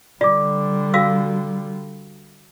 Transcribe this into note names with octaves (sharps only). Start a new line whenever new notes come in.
D3 G3 F4 D5 D6
F#4 F5 E6